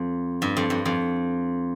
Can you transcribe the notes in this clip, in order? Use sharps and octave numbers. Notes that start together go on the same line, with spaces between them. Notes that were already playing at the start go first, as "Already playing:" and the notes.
Already playing: F2
G2
F2
G2
F2